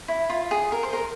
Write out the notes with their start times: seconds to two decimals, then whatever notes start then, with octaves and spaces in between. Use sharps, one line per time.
0.08 E4
0.30 F4
0.51 G#4
0.72 A#4
0.83 C5
0.93 A#4